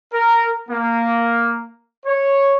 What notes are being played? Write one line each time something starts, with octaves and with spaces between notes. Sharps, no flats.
A#4
A#3
C#5